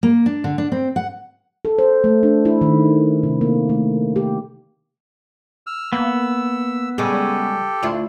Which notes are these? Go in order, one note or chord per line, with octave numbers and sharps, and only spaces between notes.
A#3
D4
D3
D4
C4
F#5
A4
C5
A3
D4
E4
D#3
C3
A#3
A3
G4
E6 F6
A#3 B3 E6
C#3 G3 G#3 G4 A4
D2 D4 E4 F4